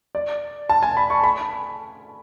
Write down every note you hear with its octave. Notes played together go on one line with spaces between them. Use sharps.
D5
A5
G#5
B5
C#6
B5